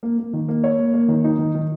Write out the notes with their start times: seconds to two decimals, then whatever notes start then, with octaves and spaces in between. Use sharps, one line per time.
0.03 A#3
0.18 A#3
0.33 D#3
0.48 A#3
0.64 C#5
0.78 A#3
0.94 A#3
1.08 D#3
1.24 D#4
1.39 D#3
1.55 D#3